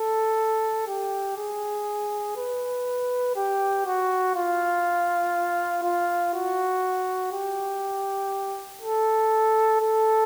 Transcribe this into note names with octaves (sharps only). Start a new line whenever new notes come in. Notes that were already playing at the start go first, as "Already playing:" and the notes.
Already playing: A4
G4
G#4
B4
G4
F#4
F4
F4
F#4
G4
A4
A4